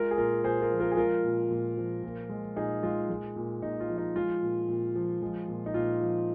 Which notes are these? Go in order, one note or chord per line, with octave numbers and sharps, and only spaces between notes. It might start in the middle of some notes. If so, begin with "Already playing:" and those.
Already playing: G#3 F4 A#4
G#4
A#2 F4 A#4
A#2 G#4 C5
F4 A#4
F3
F4 A#4
G#4
G#3 F4 A#4
A#2
A#2
F3
A#2
G#3
A#2 D#4 G#4
G#3 F4
G#3
A#2
A#2 D#4
F4
F3
D#4
G#3 F4
A#2
A#2
F3
G#3
A#2
D#4
A#2 F4
F3